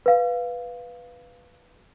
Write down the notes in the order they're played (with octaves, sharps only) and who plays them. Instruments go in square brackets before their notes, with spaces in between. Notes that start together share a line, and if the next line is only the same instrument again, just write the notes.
[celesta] B4 F5